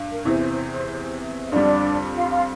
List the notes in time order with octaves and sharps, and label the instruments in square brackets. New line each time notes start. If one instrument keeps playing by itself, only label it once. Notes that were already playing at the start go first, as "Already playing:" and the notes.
Already playing: [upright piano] G2
[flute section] A#4
[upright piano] E2 C3 E3 [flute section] C5
[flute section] E5
[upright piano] F2 D3 G3 [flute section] D4 D5
[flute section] F4 F5
F4 F5